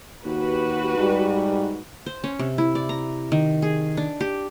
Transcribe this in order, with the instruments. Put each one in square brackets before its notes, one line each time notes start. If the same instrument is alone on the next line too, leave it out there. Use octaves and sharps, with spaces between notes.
[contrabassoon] D#2 [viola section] F#4 G4 B4
[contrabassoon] G#2 [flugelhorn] G3
[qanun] C5
C#4
C3
E4
D5
A#5
D#3
G#4
D4
G4